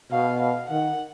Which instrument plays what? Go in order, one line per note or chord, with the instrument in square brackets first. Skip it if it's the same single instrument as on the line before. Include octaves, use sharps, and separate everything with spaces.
[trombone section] B2 [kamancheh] F5
[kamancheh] F5
[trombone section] D#3 [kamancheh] F#5